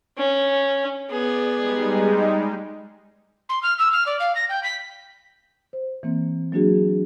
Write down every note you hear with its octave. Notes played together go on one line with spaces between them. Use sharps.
C#4
B3 G#4 D5
G3 G#3 D#4
C6
F6
E6
F6
D5
F5
A#6
G5
B6
C5
E3 A#3 C4
F#3 A#3 D4 F#4 G#4